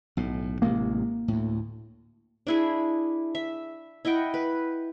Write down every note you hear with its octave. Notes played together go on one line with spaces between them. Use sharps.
B1 A2
A1 C3 G#3 A#3
D2 A2
D4 E4 G#4
E5
E4 D#5 F#5 G5
B4